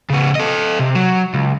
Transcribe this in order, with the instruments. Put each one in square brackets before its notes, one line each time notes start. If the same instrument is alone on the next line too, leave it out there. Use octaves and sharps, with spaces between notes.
[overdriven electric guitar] C#3 B3
A4 D#5
C3
F#3
C#2